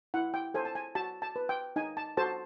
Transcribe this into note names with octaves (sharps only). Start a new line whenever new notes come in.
E4 F#5
G5
A4 C5 G#5
A5
G#5
F#4 A5
A5
B4
G5
D#4 G#5
A5
F#4 A4 C5 A5